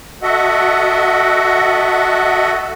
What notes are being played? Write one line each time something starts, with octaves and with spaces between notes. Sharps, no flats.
F#4 A4 D#5 E5 F#5